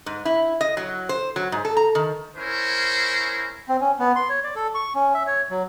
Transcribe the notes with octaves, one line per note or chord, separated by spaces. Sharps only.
G#2
E4
D#5
F#3
C5
F#3
G#2
A4
A#5
D#3
C#4 E4 A#4 C5
C4
C#4
B3
C6
C#5
D5
A4
C#6
C#4
E5
C#5
F#3